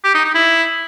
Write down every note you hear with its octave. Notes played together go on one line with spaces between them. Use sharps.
G4
D#4
D#4
E4